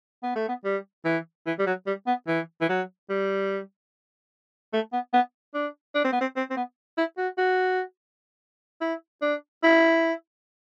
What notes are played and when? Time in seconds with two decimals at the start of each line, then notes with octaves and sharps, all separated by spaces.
0.23 B3
0.36 A3
0.49 B3
0.65 G3
1.05 E3
1.46 E3
1.59 G3
1.66 F#3
1.87 G3
2.07 B3
2.27 E3
2.61 E3
2.69 F#3
3.10 G3
4.73 A3
4.93 B3
5.13 B3
5.54 D4
5.95 D4
6.04 C4
6.12 B3
6.21 C4
6.37 C4
6.50 C4
6.57 B3
6.98 E4
7.17 F#4
7.38 F#4
8.81 E4
9.22 D4
9.64 E4